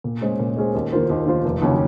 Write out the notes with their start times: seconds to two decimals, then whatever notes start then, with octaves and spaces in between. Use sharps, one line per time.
0.04 A#2
0.21 G#3 C#4 G#4 C5
0.40 A#2
0.57 G#3 C#4 G#4 C5
0.75 D#2
0.92 D#3 A#3 F4 C5
1.10 D#2
1.27 D#3 A#3 F4 C5
1.45 F1
1.62 D#2 C#3 F#3 C#4